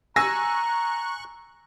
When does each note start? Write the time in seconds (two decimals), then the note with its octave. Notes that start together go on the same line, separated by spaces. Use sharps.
0.16 G#5 A#5 C#6 E6 F#6 A#6